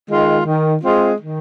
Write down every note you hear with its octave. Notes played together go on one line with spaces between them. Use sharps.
D#3 G#3 F4
D#3
G#3 C4 F4
D#3